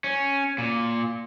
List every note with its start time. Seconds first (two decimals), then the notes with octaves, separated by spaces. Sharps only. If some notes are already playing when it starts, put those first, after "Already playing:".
0.04 C#4
0.58 A#2